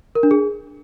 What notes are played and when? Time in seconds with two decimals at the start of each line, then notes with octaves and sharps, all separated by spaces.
0.15 A#4
0.23 D4
0.31 G#4